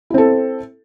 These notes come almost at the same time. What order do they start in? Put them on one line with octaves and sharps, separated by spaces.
E4 C4 A4